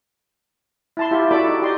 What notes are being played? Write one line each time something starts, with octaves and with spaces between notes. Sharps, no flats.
E4 A5 C6
E4 F4 G4 E5
E4 F#4 A4 D5 B5 D6
D#4
G4 D5 D#5 C6